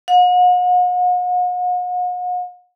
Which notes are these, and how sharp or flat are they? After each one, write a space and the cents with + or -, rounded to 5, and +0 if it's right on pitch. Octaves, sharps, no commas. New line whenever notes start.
F#5 -45